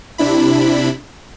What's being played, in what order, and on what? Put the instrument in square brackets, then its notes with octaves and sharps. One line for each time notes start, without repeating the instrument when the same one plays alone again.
[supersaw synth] C3 D4 E4 B5